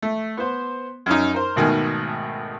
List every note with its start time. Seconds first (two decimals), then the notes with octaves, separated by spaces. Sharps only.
0.02 A3
0.37 B3 C5
1.06 F#2 C#4 D#4
1.34 A#4 C5
1.56 G#1 B2 D#3 A3 G#5